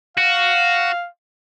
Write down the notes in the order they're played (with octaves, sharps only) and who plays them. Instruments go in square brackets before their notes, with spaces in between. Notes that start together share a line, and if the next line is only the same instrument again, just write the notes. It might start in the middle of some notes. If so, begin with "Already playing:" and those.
[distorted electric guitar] F#4 [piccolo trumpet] F5